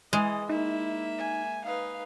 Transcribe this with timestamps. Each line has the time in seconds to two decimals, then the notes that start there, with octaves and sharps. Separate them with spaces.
0.13 E3 G#3 D#5
0.49 A#3 D#4 E4 E5
1.18 G#5
1.64 D#4 B4 F5